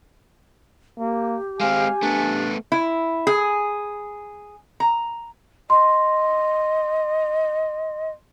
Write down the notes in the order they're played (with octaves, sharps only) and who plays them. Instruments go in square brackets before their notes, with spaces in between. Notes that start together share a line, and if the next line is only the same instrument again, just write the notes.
[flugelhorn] A#3 [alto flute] G4
[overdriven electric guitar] G#3 C4 [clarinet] F5 [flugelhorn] G#5
[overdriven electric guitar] A3 B3 [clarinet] D4
[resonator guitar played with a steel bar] E4
G#4
A#5
[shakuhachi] D#5 [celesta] C6